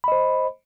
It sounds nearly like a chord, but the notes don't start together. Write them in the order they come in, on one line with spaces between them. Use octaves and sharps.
B5 D#5 C5